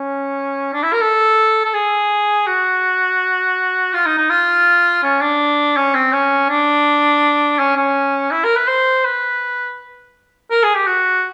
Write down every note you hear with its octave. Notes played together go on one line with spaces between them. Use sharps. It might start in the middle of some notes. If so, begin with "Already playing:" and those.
Already playing: C#4
D4
E4
A#4
A4
A4
G#4
F#4
F4
D#4
D#4
F4
C#4
D4
C#4
C4
C#4
D4
C#4
C#4
E4
A#4
B4
C5
B4
A#4
G#4
G4
F#4